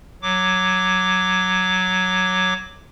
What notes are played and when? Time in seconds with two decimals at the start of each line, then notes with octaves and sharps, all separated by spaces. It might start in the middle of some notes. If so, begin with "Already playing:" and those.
0.22 F#3 D6